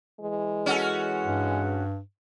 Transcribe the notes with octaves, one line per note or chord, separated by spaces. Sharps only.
E3 G#3
C#4 F#4 A4
G2